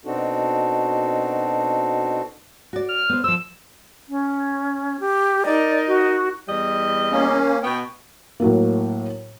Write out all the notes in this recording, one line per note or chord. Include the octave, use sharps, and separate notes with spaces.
B2 C4 D4 D#4 F#4 A4
F#4 D5
F6
B3 C5
F3 C5 E6
C#4
G4
D#4 A#4 D5 D#5
F#4
E2 G3 D#5
A#3 C#4
B2 B3 G5
A2 F#3 A#3